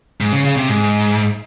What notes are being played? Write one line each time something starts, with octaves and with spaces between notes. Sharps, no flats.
G#2
C#3
C#3
C3
G#2